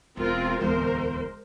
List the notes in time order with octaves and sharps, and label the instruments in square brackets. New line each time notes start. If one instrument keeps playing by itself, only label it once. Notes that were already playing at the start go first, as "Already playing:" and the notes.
[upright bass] E1 [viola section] C4 F4 A#4
[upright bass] D1 E2 [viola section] G#3 A#4 C5